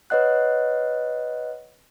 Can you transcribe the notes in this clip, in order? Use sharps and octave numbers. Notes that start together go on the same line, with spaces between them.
B4 C#5 D#5 F#5 F#6